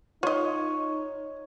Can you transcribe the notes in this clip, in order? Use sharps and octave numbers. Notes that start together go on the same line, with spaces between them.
D#4 F4 C#5 D#5